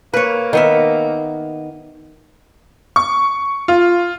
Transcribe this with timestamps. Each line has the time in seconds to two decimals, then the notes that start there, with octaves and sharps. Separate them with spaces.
0.14 A#3 B4 C#5
0.53 D#3 B3 E5
2.96 C#6
3.68 F4